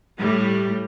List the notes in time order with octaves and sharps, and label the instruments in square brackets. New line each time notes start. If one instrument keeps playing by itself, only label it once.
[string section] A2 G3